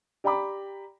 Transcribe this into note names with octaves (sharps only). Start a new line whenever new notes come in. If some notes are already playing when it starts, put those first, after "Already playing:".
G4 D5 G5 A#5 B5 D6